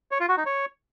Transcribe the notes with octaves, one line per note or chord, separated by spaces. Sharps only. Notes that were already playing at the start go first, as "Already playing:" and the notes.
C#5
F4
F#4
D#4
C#5